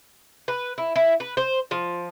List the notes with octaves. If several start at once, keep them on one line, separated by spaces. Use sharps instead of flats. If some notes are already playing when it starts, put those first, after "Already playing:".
B4
E4
E4
B4
C5
F3